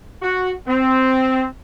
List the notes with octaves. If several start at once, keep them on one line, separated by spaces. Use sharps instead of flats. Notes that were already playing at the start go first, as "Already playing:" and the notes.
F#4
C4